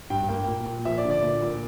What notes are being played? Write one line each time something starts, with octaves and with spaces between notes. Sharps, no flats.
G2 G5
A#3 G5
A#2
A#2
F3 E5
D5
D3
D5
A#2
A#2